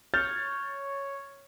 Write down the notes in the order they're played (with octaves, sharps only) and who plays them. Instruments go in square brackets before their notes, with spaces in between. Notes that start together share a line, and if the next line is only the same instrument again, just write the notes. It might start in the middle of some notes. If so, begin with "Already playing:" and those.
[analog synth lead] C#5 [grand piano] F6 G6 A6